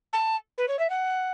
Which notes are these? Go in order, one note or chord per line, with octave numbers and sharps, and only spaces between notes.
A5
B4
C#5
E5
F#5